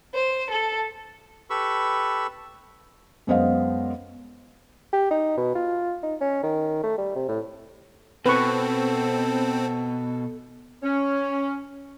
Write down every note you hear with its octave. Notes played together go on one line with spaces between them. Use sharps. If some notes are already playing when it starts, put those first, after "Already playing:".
C5
A4
G4 A4 B4 B5 C#6 E6
F#2 G#3 B3 C5 D#5 F5
G4
D#4
B2
F4
D#4
C#4
D#3
A3
G3
C3
A2
B2 C4 A4 B4 C#6
C#4